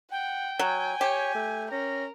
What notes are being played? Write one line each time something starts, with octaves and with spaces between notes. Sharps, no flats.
F#5 G5
F#3 G#5
G4 C#5
A3
C#4 A#4 A#6